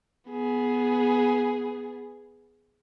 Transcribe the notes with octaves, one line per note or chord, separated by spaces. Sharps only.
B3 G#4